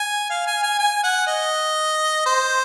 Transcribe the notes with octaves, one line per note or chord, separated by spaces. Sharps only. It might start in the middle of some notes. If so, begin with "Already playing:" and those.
Already playing: G#5
F5
G#5
G#5
G#5
F#5
D#5
C5